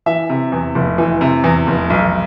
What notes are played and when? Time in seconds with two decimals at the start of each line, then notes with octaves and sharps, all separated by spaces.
0.06 E3 E5
0.29 C3
0.52 E2
0.75 F1
0.98 E3
1.21 C3
1.44 E2
1.67 F1
1.90 B1